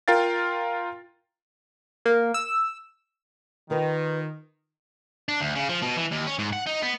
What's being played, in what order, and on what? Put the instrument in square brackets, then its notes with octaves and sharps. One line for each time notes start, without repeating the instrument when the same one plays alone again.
[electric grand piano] F4 A#4 F5 G5 A6
[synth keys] A#3
E6
[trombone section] D#3 [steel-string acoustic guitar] F4 A#4 B4
[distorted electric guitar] D4
D2
C#3
F3
B2
E3
D#2
C#4
G#2
F#5
D#4
B3